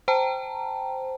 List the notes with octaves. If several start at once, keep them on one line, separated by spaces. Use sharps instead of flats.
C5 G5 A5 A#5